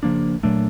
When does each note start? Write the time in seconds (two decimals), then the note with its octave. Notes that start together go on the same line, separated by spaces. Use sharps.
0.03 C#3 F3 A#3 D4
0.43 A#2 F#3 A3 D4